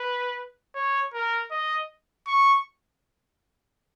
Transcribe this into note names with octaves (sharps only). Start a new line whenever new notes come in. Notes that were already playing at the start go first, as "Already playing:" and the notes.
Already playing: B4
C#5
A#4
D#5
C#6